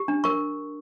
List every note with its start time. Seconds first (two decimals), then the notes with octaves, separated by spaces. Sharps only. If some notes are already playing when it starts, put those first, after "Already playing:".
Already playing: G4
0.08 D4
0.24 A#4 C#6